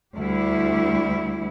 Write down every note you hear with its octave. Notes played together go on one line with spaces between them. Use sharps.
D2 G3 E4